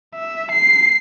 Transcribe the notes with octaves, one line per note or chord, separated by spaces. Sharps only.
E5
C7